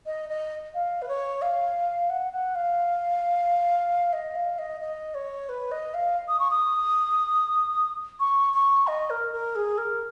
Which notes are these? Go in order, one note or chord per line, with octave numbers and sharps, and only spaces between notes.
D#5
D#5
F5
B4
C#5
F5
F#5
F#5
F5
D#5
F5
D#5
D#5
C#5
B4
D#5
F5
D#6
C#6
D#6
C#6
C#6
D#5
A#4
A#4
G#4
A#4